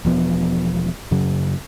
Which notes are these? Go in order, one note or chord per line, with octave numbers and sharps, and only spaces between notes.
E1 F3 B3
F#2 C#3 F#3